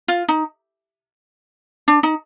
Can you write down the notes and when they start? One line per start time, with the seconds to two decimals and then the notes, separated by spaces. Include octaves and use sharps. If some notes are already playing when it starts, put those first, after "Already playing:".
0.08 F4
0.28 D#4
1.88 D4
2.03 D#4